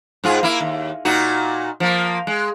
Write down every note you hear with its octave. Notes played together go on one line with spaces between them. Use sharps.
G#2 F4 G#4
A#3 E4
D#2
A#2 D#4 F#4
F3 A#3
G#3